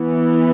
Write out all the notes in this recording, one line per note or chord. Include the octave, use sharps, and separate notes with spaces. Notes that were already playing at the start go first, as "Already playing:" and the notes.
Already playing: E3 B3